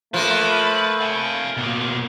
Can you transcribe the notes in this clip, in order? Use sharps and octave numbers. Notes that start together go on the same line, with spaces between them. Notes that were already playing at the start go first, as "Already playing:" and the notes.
F3 A3 A#3 B4
F5 G#5
B2 A#3